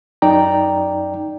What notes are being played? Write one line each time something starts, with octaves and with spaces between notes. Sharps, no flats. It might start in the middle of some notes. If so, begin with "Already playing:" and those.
F#2 D#4 D5 G5 A#5